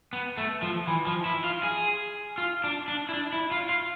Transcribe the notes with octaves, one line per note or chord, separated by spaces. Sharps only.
B3
A3
F3
E3
F3
E4
F4
G#4
F4
D4
D4
E4
D4
E4
F4
F4